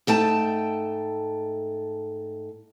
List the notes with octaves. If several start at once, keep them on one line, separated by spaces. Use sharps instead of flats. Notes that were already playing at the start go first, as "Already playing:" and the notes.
G#2 A3 G5 A5